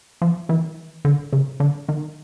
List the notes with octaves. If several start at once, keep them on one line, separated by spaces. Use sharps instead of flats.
F3
E3
D3
C#3
D3
D#3